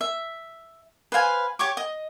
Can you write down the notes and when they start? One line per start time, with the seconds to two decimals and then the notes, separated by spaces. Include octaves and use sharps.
0.01 E5
1.12 B4 C5 F5 G#5
1.59 G4 C#5 C#6 D6
1.77 D#5